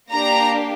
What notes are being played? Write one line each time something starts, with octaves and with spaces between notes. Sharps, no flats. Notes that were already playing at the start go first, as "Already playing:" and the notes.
A#3 D4 G4 A#5